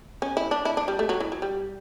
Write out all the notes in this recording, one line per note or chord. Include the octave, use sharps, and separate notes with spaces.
C#4
E4
D4
E4
D4
G3
A3
F#3
E3
F#3
G3